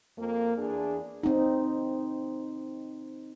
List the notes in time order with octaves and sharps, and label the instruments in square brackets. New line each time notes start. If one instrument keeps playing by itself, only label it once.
[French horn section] F2 A#3
E2 D4 G#4
[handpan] C4 D#4